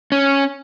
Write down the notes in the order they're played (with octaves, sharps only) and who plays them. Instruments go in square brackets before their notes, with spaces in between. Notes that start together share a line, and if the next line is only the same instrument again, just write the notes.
[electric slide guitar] C#4